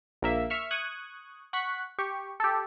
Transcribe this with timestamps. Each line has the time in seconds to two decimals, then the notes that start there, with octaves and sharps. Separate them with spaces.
0.22 A#1 A#3 E5
0.50 E5 C#6 F6
0.71 C#6 D#6 F#6 G#6
1.53 F#5 C#6 F#6 B6
1.99 G4 C#6
2.40 G4 A4